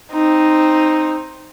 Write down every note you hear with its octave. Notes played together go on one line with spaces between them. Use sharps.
C4 D#4